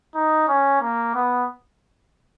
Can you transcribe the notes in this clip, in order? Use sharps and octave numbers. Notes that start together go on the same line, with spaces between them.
D#4
C#4
A#3
B3